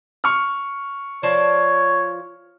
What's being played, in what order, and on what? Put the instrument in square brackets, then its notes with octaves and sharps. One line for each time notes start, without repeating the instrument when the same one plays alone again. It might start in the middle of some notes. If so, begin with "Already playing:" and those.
[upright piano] C#6 F6
[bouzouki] F3 D5 A5 [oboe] C#5